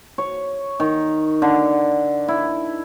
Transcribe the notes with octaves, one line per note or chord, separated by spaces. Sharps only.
C#5
D#3
D3
E4